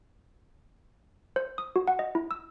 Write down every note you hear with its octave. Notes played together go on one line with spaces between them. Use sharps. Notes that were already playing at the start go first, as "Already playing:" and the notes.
C5
D#6
F#4
F#5
D#5
E4
E6